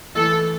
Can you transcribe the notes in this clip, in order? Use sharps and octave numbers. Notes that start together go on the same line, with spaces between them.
E3 A3 E4 A4